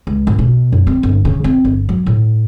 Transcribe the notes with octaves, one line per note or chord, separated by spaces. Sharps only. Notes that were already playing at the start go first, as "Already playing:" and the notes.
C#2
G#1
B2
F#2
C4
G1
C#3
C4
G1
F#3
A2